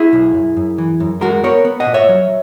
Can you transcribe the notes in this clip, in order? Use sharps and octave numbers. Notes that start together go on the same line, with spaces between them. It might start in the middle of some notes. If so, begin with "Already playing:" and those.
Already playing: E4 G#4
B1
F#2
F#2
E3
F#2
G#3 F#4 A#4
B3 A#4 C#5
B3
D#5 F#5
A#2
C#5 E5
F#3